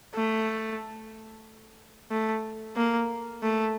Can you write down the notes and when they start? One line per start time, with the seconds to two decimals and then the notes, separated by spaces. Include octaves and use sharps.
0.15 A3
2.11 A3
2.76 A#3
3.43 A3